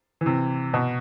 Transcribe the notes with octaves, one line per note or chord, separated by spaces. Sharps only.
E3
C3
B2